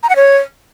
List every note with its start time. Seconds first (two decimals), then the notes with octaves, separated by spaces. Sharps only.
0.03 A#5
0.10 F#5
0.16 C#5